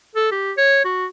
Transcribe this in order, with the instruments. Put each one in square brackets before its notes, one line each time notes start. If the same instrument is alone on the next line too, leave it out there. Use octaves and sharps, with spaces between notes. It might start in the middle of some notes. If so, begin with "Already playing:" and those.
[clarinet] A4
G4
C#5
F#4